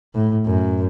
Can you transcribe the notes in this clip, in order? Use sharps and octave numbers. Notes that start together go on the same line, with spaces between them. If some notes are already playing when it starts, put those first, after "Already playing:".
A2
F#2